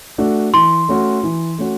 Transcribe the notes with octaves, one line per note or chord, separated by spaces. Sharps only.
A3 D4 F#4
E3 C6
A3 C#4 F#4
E3
A3 C#4 F#4